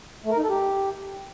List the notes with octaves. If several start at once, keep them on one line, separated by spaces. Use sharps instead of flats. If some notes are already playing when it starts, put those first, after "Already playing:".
A3
A#4
D#4
A4
G4